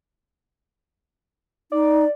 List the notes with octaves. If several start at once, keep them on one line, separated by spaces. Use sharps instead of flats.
D#4 D5